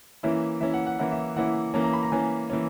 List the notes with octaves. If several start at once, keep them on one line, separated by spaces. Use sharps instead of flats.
E3 A#3 C#4 E4 E5
E3 A#3 C#4 E4 E5
F#5
F#5
E3 A#3 C#4 E4 F#5
E5
E3 A#3 C#4 E4 F#5
E3 A#3 C#4 A#5
A#5
B5
A#5
E3 A#3 C#4 G#5
E3 A#3 C#4